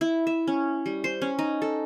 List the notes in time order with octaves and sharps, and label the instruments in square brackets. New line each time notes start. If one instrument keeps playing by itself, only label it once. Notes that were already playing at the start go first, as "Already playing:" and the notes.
[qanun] E4
E5
C#4
G3
C5
C#4
D#4
A4